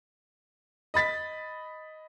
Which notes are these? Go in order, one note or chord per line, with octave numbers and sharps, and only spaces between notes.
D#5 B5 A6 B6